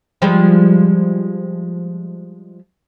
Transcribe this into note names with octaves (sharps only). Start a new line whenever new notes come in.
F3 G3 G#3